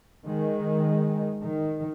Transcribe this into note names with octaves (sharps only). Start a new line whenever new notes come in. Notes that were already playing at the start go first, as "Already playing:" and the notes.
D#3 G#3
D#3